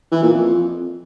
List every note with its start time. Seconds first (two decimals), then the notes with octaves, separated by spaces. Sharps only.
0.12 E3
0.22 A#2
0.33 F2